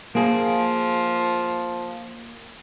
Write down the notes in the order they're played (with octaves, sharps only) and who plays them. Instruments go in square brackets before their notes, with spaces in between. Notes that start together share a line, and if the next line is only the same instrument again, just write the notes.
[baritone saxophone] F3 [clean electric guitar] A#3 G#4